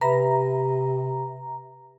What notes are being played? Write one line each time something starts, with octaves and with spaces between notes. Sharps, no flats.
C3 B4 E5 A#5 B5